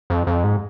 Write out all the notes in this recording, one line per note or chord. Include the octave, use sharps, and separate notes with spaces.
F2
F2
G#2